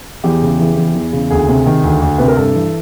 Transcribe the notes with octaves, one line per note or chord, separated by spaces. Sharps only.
E2 G4
C#3
E3
E2
E2
C#3
D2 G#4
C3
D#3
D2
D2
C3 B4
A#4
G2 A4
E3